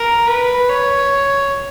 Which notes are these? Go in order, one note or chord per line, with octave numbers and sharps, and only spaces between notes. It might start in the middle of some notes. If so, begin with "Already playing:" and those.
Already playing: A#4
B4
C#5